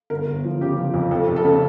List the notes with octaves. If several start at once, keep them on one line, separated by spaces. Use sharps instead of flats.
G1 A#4
G1
F3
C#3 G4
F3
F2
F2 A4
F1
A4
C#3